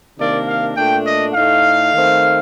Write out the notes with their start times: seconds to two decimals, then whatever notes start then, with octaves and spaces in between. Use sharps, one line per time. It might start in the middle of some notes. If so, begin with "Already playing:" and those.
0.18 C3 D#3 A#3 D4 D5
0.47 F5
0.76 A#2 A3 D4 G5
1.05 D#5
1.34 A2 A3 D#4 F5
1.93 D#3 A3 C4